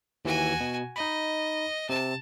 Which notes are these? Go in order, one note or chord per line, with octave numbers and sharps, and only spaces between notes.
D#2 E3 F#4 G#5
B2
D#4 D#5 B5
C3 C4 A5